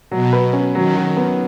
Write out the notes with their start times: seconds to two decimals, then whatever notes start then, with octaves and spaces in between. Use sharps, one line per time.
0.11 B2 F#3
0.33 B4
0.53 C#4
0.75 D#3 F#3
0.96 F#4
1.17 B3